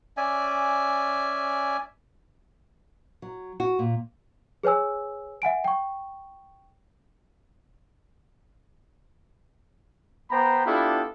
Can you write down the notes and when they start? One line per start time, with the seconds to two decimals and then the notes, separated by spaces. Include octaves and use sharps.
0.17 C#4 D5 E5 G#5
3.22 F#3
3.60 F#4
3.79 A#2
4.63 G#4 B4 C#5 G#5 E6
5.42 E5 F#5 G#5 D7
5.64 G5 C#6
10.31 B3 C5 G5 A#5 B5
10.66 B3 D4 E4 F4 G4 A4